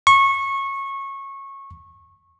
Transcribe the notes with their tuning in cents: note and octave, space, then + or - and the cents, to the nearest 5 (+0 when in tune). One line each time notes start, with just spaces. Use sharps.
C#6 -20